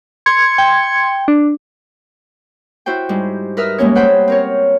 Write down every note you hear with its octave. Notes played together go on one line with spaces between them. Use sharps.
C6 G#6 C#7
G5
D4
E4 F#4 C5 G5
G#2 G3
A#4 B4 E5 D#6 F6
G3 G#3 A#3 B3 C#4 C#5
B4 C5 F#5 G5 B5
C4 A#4 C#5